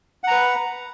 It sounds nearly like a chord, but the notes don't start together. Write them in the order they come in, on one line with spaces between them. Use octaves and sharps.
F#5 A#5 B4